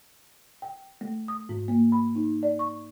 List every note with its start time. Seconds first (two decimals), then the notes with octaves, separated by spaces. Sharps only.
0.62 G5
1.01 A3
1.28 D#6
1.49 G#2
1.68 A#3
1.92 B5
2.15 D#4
2.43 D5
2.59 C#6